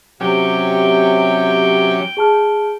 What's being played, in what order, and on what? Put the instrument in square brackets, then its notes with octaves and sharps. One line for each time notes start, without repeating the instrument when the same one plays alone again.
[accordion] C3 [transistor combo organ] F#3 C#4 G4 [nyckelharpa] G5
[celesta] G#4 A5 F6